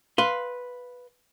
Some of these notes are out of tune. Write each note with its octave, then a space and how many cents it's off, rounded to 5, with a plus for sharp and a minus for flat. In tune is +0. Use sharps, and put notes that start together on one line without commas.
B4 +0 F5 +0 C6 +0